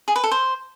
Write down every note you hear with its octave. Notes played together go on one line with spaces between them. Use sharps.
G#4
B4
A4
C5